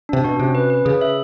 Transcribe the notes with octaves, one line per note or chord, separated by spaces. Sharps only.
C3 D4
B2 F#4
C3 C#4
B4
B4
C#3 G#4
E5